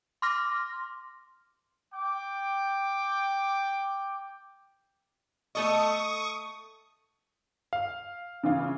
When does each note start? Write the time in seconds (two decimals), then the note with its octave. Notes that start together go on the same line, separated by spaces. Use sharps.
0.22 C6 D6 F6 A#6
1.93 G5 D6
5.55 A3 A4 D#5 C#6 D#6
7.73 F5
8.43 C#3 E3 F4